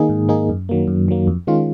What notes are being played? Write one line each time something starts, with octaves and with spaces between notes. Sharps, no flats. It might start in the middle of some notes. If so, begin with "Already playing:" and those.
Already playing: D#3 A#3 D#4 G#4
G#2
D#3 A#3 D#4 G#4
F#2
D#3 F#3 A#3
F#2
D#3 F#3 A#3
F2
D#3 G#3 C#4 F4